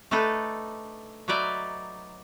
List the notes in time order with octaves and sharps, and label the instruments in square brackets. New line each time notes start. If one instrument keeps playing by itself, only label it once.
[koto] A3 D4 D#4 A4 B4
F#3 D#4 B4 D5 E5